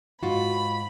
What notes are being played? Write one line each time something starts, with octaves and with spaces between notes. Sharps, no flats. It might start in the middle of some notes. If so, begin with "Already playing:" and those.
G#2 F4 F#4 B5